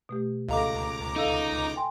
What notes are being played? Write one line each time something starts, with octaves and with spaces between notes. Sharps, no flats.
B2 A3 G4
C#2 A4 D#5 F5 A#5 D6
D#4 A4 F5 E6
G5 G#5 C6